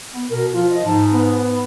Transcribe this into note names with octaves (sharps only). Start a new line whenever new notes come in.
B3
B2 A#4
F3 F4
D#5
G#2 A5
B3